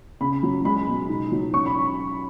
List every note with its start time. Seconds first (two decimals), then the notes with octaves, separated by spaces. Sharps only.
0.21 C#3 B5
0.43 F#3
0.65 G#3 B5
0.87 B2
1.08 D#4
1.32 F#3
1.53 C#4 C#6
1.66 B5